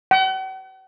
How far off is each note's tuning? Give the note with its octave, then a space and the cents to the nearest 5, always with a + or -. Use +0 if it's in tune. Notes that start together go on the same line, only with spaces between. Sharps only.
F#5 +45